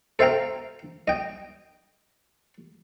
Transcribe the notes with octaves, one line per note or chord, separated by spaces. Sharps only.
A4 C5 E5 F5 G5 A#5
D#5 G5